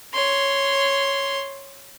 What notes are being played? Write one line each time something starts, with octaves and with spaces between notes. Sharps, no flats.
C#5 C6